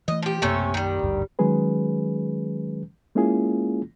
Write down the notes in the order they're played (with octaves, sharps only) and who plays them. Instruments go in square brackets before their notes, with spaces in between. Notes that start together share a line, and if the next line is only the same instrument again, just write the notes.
[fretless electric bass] E3 A3 [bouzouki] D#5
[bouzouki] F3 G4
[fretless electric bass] B1 F#2 A#3 [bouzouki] C3 A3 C#4
[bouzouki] D#3 G3
[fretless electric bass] G#1 D2 G2
[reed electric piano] D#3 F#3 G#3 C#4 G#4 B4
G#3 A#3 C#4 E4 F4 G#4